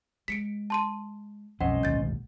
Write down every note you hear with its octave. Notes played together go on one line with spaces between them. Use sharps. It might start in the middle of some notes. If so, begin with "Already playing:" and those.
G#3 B6 C#7 D7
A5 C6 D#7
B1 F2 G#2 C#4 C5 D#5 F#5
D1 G#1 D#2 G6 A6